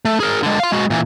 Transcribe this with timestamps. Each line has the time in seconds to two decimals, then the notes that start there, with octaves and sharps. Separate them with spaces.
0.05 A3
0.20 G#4 A#4
0.43 D3 G#3
0.60 F5 C6
0.72 G#3 F#4
0.90 A#2 E3